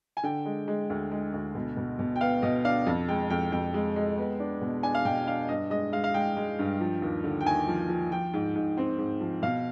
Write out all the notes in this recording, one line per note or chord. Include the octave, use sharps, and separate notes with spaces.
G#5
D3 G5
G#3
G#3
D2
G#3
D2
B2
B2
B2
G5
B3 F5
B2 D#5
D4 F5
F2
G#3 G5
F2 G5
F2 G5
G#3
G#3
B3
D4
B2
D4 G#5
F5
B2 G5
D4 F5
G2 D#5
G#3 D#5
G#3 F5
F5
G#3 G5
G#3
G2
F3
D#2
D3
G5
D#2 G#5
F3
F3
F3 G5
G#2
G#2
C4
G#2
F3
B2 F5